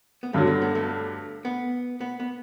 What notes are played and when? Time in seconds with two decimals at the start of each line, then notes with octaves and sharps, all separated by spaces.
0.23 B3
0.33 G2 D3 F#3 A3
0.47 B3
0.62 B3
0.75 A3
1.45 B3
2.01 B3
2.20 B3